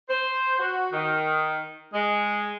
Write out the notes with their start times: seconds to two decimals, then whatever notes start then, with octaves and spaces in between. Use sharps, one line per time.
0.09 C5
0.59 F#4
0.93 D#3
1.93 G#3